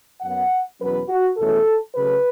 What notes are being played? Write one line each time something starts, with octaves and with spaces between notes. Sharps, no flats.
F#2 F#3 B3 F#5
E2 B2 F#3 C#4 B4
F#4
E2 B2 A3 C#4 A4
C#3 F#3 A3 B4